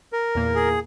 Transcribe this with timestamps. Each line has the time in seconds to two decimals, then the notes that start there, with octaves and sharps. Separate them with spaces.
0.12 A#4
0.35 E2 A#2 A#3
0.55 G#4